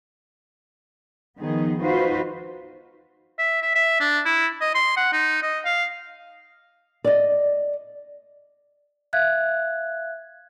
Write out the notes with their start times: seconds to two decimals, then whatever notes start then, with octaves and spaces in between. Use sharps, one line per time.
1.39 D#3 F3 B3 D#4 G#4
1.81 D#4 F4 F#4 B4 C5 F5
3.39 E5
3.62 E5
3.75 E5
4.00 D4
4.25 E4
4.61 D#5
4.75 C6
4.97 F#5
5.13 D#4
5.42 D#5
5.65 F5
7.04 D5 D#5
9.13 E5 F5 F#6 G#6